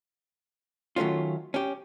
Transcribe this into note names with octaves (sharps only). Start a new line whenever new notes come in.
D#3 F#3 A3 C#4 F4
C#4 G4